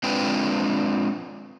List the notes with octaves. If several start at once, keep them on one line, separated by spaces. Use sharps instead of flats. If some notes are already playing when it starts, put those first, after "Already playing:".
G#3 C4 D4 F4 B4 G5